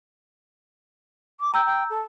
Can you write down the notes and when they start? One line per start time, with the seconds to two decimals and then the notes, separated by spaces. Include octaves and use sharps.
1.40 D6
1.54 G5 A#5 E6 G6
1.66 G5
1.90 A4